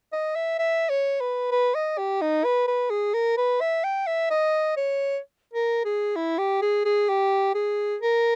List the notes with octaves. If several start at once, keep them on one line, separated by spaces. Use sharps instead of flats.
D#5
E5
E5
C#5
B4
B4
D#5
G4
D#4
B4
B4
G#4
A#4
B4
E5
G5
E5
D#5
C#5
A#4
G#4
E4
G4
G#4
G#4
G4
G#4
A#4